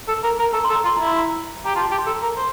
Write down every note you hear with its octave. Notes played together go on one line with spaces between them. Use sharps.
A4
A#4
A#4
A4 A#5
A4 C6
A#5
F4 C6
E4 A#5
C6
A#5
G4 A#5
F4 A5
G4
C6
A4 A#5
A#4
C5